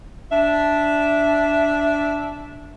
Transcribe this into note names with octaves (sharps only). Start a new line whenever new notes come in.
D4 E5